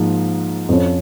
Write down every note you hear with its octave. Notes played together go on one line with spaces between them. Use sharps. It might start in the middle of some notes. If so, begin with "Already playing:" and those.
Already playing: G#2 F3 A#3
F2 F3 C#4